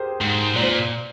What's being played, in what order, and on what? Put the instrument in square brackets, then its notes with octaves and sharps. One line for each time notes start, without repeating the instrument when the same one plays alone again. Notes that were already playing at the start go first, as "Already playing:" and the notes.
Already playing: [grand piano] G4 G#4 A#4 C5
[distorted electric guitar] G#2
[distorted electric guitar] A#2 [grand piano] D5
[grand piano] C5